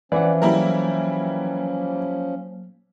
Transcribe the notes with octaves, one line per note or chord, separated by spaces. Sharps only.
E3 F3 C#4 D5 E5 F#5
F#3 G3 A#3 E4 A#4